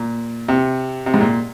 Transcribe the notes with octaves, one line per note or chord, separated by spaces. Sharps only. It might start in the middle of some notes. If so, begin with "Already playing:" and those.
Already playing: A#2
C3
C3
G#2
A#2